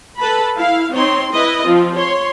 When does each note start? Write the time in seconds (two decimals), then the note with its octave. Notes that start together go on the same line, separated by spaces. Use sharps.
0.19 A4 B4 A5 B5
0.58 E4 F5
0.93 C4 D#4 C#5 C6
1.33 E4 B4 D#5
1.65 F3 C4 F4
1.96 C#5 C6